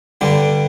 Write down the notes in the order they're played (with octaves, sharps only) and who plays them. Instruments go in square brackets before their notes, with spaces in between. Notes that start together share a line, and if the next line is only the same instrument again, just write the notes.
[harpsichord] G2 D3 G3